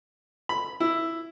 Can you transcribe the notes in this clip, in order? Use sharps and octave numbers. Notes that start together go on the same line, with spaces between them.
B5
E4